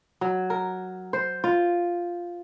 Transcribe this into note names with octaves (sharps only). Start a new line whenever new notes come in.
F#3
A#4
C5
F4